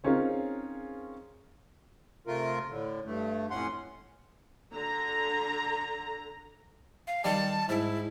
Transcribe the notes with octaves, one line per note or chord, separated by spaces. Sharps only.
C4 C#4 D#4 F4 G#4 A#4
C3 A3 F4 A#4
A2 D3
G2 A3
F2 A2 C#4 F#5 C6
D3 A#5
F5
D#3 G3 A5
G#2 E4